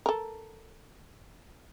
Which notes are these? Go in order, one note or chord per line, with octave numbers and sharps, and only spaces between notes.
A4 A#4